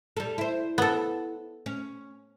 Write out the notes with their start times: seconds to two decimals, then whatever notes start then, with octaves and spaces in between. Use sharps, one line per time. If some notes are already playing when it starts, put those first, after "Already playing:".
0.17 G3 A4
0.38 E4 C5
0.78 B3 A4
1.66 C#4